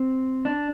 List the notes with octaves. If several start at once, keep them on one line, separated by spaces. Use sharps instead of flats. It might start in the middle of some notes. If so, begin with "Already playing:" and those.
Already playing: C4
D4